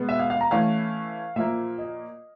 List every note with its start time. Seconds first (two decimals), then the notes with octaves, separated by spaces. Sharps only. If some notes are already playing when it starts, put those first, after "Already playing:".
Already playing: B2 G#3 B3
0.09 E5
0.19 F5
0.30 F5
0.41 A#5
0.51 E3 A3 C#4 E4 F5
1.36 A#2 F3 A#3 E5
1.78 D#5